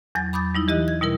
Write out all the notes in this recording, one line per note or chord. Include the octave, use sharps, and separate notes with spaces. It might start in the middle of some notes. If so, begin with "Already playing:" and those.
E2 F#3 A6
B5 D6 D#6 G6 A6
G3 D#4 E4
E3 G4 D#5 F#6
G#6
B2 G3 E4 A#4